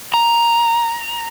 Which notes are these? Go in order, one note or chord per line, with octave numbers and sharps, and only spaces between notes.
A#5